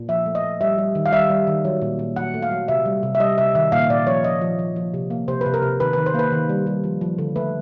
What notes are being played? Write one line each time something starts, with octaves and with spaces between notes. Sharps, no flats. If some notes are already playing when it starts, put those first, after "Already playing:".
Already playing: A#2
F3 E5
A3
D#5
A3
G3 E5
G3
D#3
F5
G3 E5
G3
D#3
F#3
A#2
A#2
F#3 F#5
A3
F5
F#3
C3 E5
G3
C3
E5
G3 D#5
C3 E5
D#3 E5
A#2 F5
A#2 D5
F3 C#5
F3 D#5
F3
F3
F3
C3
A#3
C3 C5
B4
C3
A#4
C3
D#3 B4
B4
D#3
C5
A#3 B4
D#3
G3
G3
F3
F3
D3
A3 B4